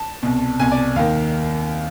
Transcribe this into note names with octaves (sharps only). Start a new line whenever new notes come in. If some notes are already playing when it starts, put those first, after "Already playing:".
Already playing: A5
C2 B2
C2 B2 G#5
D5
D#2 D#3 F5